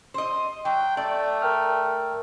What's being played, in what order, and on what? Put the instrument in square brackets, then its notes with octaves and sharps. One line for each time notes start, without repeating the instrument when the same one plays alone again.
[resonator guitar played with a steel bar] C5 D#5
[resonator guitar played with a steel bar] F#3 [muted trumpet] G5
[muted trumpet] A3 [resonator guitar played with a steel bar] D5
[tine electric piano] A#4 G5 F6